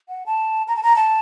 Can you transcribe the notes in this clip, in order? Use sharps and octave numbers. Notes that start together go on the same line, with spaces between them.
F#5
A5
A#5
A5
A#5
A5